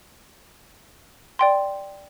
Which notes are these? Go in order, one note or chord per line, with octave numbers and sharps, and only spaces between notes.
D5 G5 C6